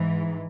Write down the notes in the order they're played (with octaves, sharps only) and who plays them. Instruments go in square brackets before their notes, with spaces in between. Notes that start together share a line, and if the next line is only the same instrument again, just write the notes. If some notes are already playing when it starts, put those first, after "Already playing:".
Already playing: [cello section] G#2 E3